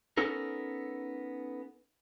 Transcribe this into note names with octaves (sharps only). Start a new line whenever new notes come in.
B3 C#4 D#4 A4 A#4